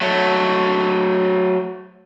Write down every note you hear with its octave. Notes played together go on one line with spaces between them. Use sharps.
F#3 A3